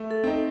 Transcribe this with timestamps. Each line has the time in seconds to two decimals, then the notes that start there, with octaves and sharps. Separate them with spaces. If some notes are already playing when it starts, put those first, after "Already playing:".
Already playing: A3
0.11 A4
0.24 C4 D#4